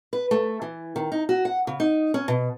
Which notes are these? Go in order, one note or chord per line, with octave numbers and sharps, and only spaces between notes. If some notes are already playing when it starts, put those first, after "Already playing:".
B4
A3
E3
D#3
D#4
F#4
F#5
C#3
D#4
C#4
B2